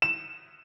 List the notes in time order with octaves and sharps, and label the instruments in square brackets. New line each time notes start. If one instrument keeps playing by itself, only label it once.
[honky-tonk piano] E7